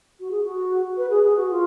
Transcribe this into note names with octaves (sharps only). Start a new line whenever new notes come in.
F#4
G#4
F#4
B4
G#4
G#4
F#4
F4